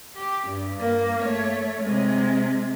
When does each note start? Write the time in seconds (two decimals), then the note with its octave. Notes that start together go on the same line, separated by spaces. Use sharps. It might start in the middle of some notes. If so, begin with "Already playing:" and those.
0.15 G4
0.48 G2
0.79 G2 A#3
1.21 A3 C#5
1.82 C3 G#3